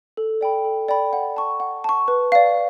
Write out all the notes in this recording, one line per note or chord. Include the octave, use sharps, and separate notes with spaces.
A4
D5 G5 B5
A4
D5 G5 B5
F#5
A5 C#6
F#5
A5 C#6
B4
D5 F5